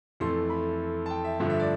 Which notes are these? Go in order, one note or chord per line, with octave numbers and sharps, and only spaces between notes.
F2 E3 A3 C6
B5
A5
G5
E5
G2 D3 F3 A3 E5
E5
D5